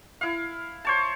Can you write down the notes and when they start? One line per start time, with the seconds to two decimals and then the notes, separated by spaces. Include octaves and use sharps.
0.21 E4 F5
0.85 C5 C#5 A5